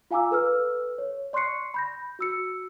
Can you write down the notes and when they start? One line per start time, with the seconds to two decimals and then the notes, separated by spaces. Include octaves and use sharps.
0.11 F4 F5 G#5 A#5 D6 E6
0.31 A4 B4 E6 F6
0.98 C#5
1.33 D5 C6 C#6 F#6 C7 C#7
1.74 B5 G6 A#6
2.19 F#4 E6 C#7